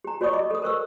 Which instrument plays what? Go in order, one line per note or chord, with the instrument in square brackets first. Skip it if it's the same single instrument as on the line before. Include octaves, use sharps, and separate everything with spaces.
[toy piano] G4 A#5
F#4 C#5 D5 C#6 D#6
D#5 D6
A4 D#6
A#4 C5 C#6 E6